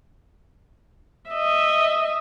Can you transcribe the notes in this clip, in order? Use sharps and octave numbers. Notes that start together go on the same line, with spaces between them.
D#5 E5